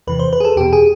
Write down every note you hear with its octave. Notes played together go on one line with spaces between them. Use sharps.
E2 C3 E3 B4
C5
B4
G#4
A4
E2 B2 G4
G#4